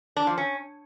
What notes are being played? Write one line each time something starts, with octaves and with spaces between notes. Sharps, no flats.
D4
F3
C#4